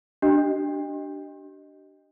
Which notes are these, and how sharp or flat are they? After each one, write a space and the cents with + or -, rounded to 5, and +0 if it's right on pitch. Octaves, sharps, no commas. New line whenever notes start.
D4 +0 G4 -35 D#5 +0